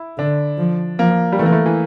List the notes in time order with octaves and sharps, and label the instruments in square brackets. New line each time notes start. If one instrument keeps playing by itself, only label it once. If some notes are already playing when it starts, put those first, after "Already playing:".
Already playing: [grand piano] E4
[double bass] D3 [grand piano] D4
[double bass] F3
[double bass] F3 [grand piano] A#3
[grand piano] G3
[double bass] E3 [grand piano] A3
[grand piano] A#3
A3
E3